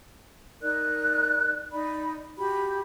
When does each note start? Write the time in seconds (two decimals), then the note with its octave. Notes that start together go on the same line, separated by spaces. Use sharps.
0.61 D#4 A#4 D5 F#6
1.70 D#4 D5 B5
2.37 F#4 G4 B5